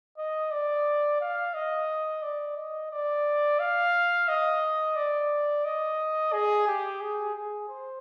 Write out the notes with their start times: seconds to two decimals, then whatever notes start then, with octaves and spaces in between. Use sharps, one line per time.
0.18 D#5
0.51 D5
1.21 F5
1.54 D#5
2.22 D5
2.57 D#5
2.92 D5
3.60 F5
4.28 D#5
4.96 D5
5.65 D#5
6.33 G#4
6.67 G4
7.01 G#4
7.35 G#4
7.69 C5